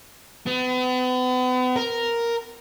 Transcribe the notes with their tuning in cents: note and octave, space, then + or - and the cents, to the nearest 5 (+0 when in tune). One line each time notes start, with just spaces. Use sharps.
B3 +40
A#4 +0